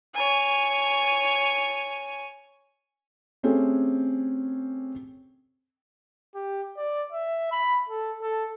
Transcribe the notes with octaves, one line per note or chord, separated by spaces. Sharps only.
C#5 G#5
A3 C4 C#4 G4 G#4
G4
D5
E5
B5
A4
A4